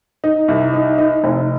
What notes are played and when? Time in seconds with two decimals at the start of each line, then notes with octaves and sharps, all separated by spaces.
0.24 D#4
0.48 C2
0.74 D#4
0.98 D#4
1.24 F1